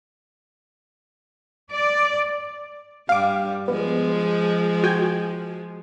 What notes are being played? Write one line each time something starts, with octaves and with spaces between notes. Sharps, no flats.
D5
G2 G3 F5 D6
F3 G#3 B3
F#4 G5 G#5